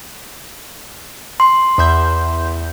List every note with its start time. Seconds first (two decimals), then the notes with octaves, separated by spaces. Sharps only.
1.40 C6
1.78 E2 E5 G6